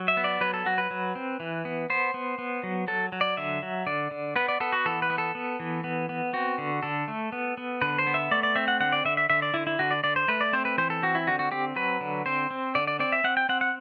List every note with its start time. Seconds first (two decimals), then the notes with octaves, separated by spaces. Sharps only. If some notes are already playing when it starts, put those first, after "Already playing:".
Already playing: F#3
0.08 E5
0.17 B3
0.24 D5
0.41 F#3 B4
0.54 A4
0.66 F#3 F#4
0.78 B4
0.91 F#3
1.15 C4
1.40 E3
1.65 B3
1.90 B3 C5
2.14 B3
2.38 B3
2.63 F#3
2.88 F#3 A4
3.12 F#3
3.21 D5
3.37 D3 E5
3.63 F#3
3.86 D3 D5
4.11 D3
4.36 B3 B4
4.48 D5
4.60 B3 A4
4.73 F#4
4.86 E3 A4
5.02 B4
5.10 B3
5.18 A4
5.35 B3
5.60 E3
5.84 B3
6.09 B3
6.33 C4 F#4
6.58 D3
6.83 D3 A4
7.08 A3
7.32 B3
7.58 B3
7.82 D3 B4
7.98 C5
8.07 B3
8.14 E5
8.31 A3 D5
8.43 D5
8.56 C4 E5
8.68 F#5
8.80 D3 F#5
8.92 D5
9.05 D3 E5
9.17 E5
9.30 D3 E5
9.42 D5
9.54 D3 E4
9.67 E4
9.79 D3 F#4
9.91 D5
10.04 D3 D5
10.16 C5
10.28 A3 B4
10.41 D5
10.53 C4 C5
10.65 B4
10.78 E3 C5
10.90 A4
11.02 C4 F#4
11.15 E4
11.27 D3 F#4
11.39 F#4
11.52 C4 G4
11.76 F#3 B4
12.01 D3
12.26 C4 C5
12.51 C4
12.75 D3 D5
12.87 D5
12.99 C4 D5
13.12 E5
13.24 C4 F#5
13.37 G5
13.49 C4 F#5
13.61 F#5